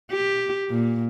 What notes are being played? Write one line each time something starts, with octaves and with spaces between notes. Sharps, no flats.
G4
A#2